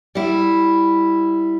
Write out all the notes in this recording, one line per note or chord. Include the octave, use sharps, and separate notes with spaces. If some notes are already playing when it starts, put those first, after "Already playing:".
G3 E4